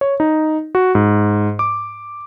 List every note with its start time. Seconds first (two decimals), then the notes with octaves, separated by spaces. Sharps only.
0.01 C#5
0.20 D#4
0.75 F#4
0.95 G#2
1.59 D6